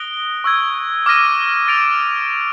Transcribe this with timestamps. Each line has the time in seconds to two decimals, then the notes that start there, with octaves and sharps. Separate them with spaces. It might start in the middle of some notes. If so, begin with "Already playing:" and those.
Already playing: D#6 F#6 A#6 D7 G7
0.44 C#6 E6 G#6
1.06 D6 F6 A#6 D#7
1.68 A6 D7 F7